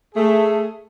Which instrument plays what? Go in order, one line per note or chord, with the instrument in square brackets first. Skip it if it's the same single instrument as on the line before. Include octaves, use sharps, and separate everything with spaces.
[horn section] A3 G#4